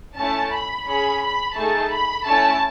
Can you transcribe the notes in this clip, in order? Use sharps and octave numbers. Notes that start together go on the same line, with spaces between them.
A3 C#4 E4 A5
B5
C#4 G#4 B5
B5
A3 D#4 G#4 A5
B5
A3 C#4 E4 A5